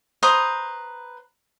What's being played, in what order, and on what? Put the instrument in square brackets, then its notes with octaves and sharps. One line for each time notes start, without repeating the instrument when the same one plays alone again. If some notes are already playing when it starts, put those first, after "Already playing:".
[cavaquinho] B4 C5 A#5 D#6